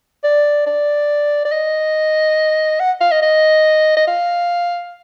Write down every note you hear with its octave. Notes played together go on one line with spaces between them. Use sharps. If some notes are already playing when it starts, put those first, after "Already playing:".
D5
D5
D5
D#5
F#5
F5
D#5
D#5
D#5
F5